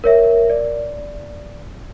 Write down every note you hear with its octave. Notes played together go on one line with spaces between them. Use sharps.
A#4 C#5 E5
D5